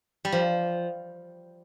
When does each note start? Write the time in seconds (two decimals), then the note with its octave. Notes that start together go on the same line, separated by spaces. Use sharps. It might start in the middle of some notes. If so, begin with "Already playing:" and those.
0.25 G3
0.32 F3